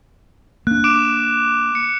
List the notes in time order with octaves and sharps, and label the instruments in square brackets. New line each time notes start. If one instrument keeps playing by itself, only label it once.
[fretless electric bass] A#3 D4 [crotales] F#6
[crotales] D6 D7 E7
C#7